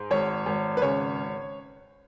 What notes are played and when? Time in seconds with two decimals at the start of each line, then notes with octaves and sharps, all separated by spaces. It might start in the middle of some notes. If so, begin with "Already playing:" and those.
Already playing: G#2
0.11 G#1 C#5
0.46 G#1
0.77 B4
0.81 C#3 C#5